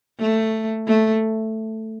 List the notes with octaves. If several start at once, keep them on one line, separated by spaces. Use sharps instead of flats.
A3
A3